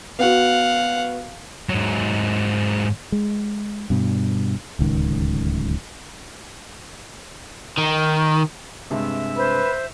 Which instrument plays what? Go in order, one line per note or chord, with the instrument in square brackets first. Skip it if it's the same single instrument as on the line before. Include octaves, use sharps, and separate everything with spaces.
[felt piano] B3 F#4 [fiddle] F5 F#5
[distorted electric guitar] G#2 F#3
[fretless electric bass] G#3
G2 B2
D1 C#2 D#3
[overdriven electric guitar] D#3
[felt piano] G2 C3 G#3 [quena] E5
[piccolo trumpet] B4 [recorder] C5